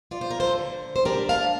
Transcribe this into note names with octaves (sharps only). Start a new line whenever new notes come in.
F4 D5
C5
A#4
A4 C5
D3
C5
D4 G4 A#4
F5 A5